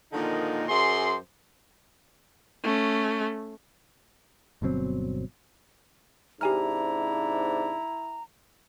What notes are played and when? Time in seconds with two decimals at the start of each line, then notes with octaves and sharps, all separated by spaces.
0.13 A#2 D3 D#3 F3 G#3 D#4
0.68 F#2 G#4 C5 C6
2.64 A3 C#4
4.62 G1 B2 F#3 C4
6.41 G#2 C3 D4 E4 G4 G#5 A#5 F6